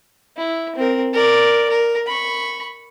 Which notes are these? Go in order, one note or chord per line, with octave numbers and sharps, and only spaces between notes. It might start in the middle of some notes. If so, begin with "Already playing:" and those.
E4
C4 A#4
A#4 D5
A#4
B5 C#6